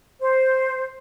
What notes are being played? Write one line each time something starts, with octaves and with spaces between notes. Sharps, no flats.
C5